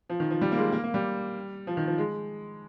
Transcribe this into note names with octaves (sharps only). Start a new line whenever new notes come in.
F3
D#3
F3
G3
A#3
G#3
A#3
A#3
G3
F3
D#3
F3
G#3